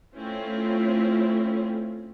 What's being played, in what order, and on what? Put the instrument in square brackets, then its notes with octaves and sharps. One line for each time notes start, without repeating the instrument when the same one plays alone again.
[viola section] A3 C4 C#4 E4 F4